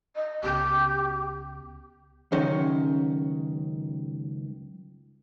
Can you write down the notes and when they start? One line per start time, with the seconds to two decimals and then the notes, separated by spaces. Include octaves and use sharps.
0.15 D#5
0.43 C#2 B3 G4
2.32 C#2 F#2 D#3 C#4